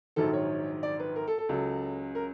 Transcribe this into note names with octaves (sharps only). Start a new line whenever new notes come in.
A#1 G#2 D#3 F#3 A4
C#5
D5
B4
A#4
A4
A4
C#2 C#3 F#3
A#4